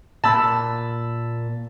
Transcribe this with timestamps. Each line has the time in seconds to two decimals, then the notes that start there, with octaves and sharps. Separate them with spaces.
0.24 A#2 A5 B5 E6